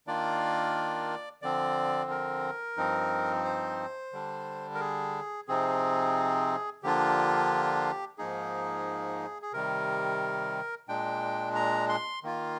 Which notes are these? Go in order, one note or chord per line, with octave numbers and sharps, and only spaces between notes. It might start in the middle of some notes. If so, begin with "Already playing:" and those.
D#3 A#3 D4 F4 D5
D3 F3 C4 D5
A#4
G2 F3 C4 D#4
C5
D3 G3 D4
A#4
G#4
C3 F3 C4 D#4 G#4
D3 F3 A#3 D4 F4 G4
G#2 F3 A#3 D#4 G#4
G#4
C3 D#3 G3 A#4
A#2 G#3 D4 G5
A#5
C6
D#3 A#3 F4